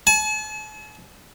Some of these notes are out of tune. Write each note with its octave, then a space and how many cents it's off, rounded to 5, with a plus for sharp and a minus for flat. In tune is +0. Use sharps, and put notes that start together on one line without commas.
A5 -45